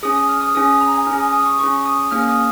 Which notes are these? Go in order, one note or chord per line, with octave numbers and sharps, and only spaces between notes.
C#4 G#4 D#6
D#6
F6
D#6
C#4 G#4 D#6
D#6
A#5
G#5
C#4 G#4 F6
D#6
D#6
C#6
C#4 G#4 C#6
D#6
A#3 C#4 G#4 F6
D#6